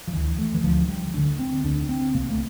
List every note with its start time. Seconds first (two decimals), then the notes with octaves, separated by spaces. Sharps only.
0.08 F3
0.13 D2 D3 E3
0.39 A3
0.54 E3
0.64 D2 D3 F3
0.88 G3
1.14 D2 D3 D4
1.39 C4
1.64 D2 D3 D4
1.89 C4
2.15 C2 C3 A#3
2.30 A3